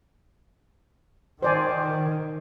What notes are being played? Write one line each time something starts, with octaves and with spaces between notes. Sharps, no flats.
D#3 C5 D5 G#5